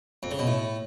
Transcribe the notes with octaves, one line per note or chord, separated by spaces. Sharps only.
F2
C#3
B2
A2